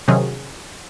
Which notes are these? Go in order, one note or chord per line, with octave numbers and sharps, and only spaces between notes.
C3 D#3 F#3 C#4 G#4